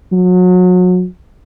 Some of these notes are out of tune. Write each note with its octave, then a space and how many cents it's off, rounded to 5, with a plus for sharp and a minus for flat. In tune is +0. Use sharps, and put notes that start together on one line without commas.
F#3 -30